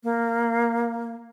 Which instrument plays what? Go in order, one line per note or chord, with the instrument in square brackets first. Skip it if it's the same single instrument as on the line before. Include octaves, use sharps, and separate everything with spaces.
[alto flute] A#3